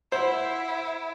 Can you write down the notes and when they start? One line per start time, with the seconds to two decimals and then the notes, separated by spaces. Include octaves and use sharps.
0.12 E4 C5 F#5